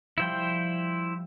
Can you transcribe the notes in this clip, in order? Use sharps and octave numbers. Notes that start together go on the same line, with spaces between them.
F3 G3 E4 C5 G5